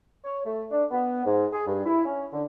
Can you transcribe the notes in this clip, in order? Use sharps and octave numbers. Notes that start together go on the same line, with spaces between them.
C#5
A3
D4
B3
G#2
G#4
G2
E4
C#4
D3